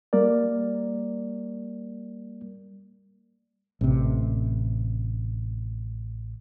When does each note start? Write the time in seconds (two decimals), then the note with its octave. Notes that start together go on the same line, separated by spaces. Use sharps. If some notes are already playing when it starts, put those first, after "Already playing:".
0.13 G3 A#3 A#4 D5
3.81 A1 C3